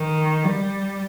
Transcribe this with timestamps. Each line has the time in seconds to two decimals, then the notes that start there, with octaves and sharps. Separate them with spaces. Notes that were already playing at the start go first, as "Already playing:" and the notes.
Already playing: D#3
0.45 G3